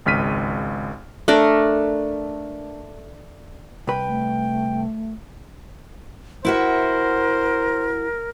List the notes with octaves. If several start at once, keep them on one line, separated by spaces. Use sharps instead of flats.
G#1 C#2 F6 B6 D#7
A3 D4 A#4
C2 B4 G5
A3
E4 F#4 A#4 C5 E5